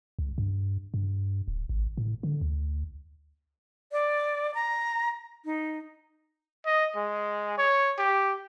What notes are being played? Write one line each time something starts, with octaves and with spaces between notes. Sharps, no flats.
C#2
G2
G2
D1
G#1
A2
D3
D2
D5
A#5
D#4
D#5
G#3
C#5
G4